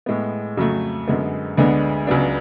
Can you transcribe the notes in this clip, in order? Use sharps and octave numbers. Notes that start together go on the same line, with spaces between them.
A2 G#3 B3
F2 C#3 F#3 A3
F#2 D3 G#3 B3
D2 D3 G#3 B3 D4
C#2 C#3 F#3 B3 D4